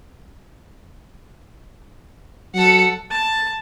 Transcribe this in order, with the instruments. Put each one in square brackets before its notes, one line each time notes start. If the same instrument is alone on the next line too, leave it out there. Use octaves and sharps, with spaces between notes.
[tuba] F#3 [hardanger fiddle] A4 F#5
[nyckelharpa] A5